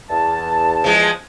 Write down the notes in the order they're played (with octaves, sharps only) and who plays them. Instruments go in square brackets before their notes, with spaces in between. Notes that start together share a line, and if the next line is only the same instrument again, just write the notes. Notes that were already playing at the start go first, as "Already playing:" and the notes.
[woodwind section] E2 A5
[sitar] F3 G#3